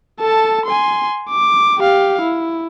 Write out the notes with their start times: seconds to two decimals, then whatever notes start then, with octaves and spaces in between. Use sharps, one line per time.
0.20 A4 A5
0.66 G#5 C6
1.30 D6
1.79 G4 F5
2.21 E4